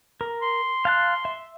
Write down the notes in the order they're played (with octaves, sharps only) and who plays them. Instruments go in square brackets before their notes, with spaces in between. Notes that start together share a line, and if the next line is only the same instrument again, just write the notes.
[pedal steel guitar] A#4
[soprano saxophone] C6
[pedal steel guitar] F5 A5 F#6
E5